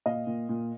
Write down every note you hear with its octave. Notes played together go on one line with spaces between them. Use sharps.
A#2 D#5 F5
A#2
A#2